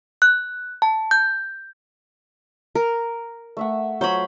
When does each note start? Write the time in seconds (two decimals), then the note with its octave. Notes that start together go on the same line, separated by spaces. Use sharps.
0.22 F#6
0.82 A5
1.11 G6
2.75 A#4
3.57 A3 E5 F#5
4.01 F#3 F4 C5 C#5 B5